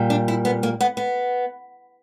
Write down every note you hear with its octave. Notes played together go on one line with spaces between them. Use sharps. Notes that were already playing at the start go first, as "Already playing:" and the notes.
Already playing: A#2 G3
D4
E4
B3
A#3
B3
B3